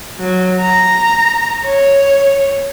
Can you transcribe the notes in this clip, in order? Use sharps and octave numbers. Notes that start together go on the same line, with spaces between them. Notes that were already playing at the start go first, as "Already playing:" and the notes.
F#3
A#5
C#5